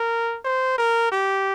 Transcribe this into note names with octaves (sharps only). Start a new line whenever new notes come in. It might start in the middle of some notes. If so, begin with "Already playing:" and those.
Already playing: A#4
C5
A#4
G4